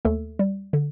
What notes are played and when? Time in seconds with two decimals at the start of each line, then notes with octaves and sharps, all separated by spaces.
0.05 D#2 A3 A4
0.39 G3
0.73 D3